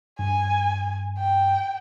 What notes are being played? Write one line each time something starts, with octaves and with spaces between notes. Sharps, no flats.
G2 G#5
G5